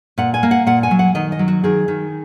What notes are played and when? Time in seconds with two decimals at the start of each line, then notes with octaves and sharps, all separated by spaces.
0.18 A#2 F#5
0.34 G#5
0.43 A#3
0.51 F#5
0.67 A#2 F#5
0.83 G#5
0.91 F#3
0.99 F#5
1.15 D#3 D#5
1.32 D#5
1.39 F#3
1.48 F#4
1.64 D#3 G#4
1.88 D#3